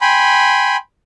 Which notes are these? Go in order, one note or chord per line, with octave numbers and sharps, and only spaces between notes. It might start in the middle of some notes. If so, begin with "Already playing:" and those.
G5 G#5 B5 C6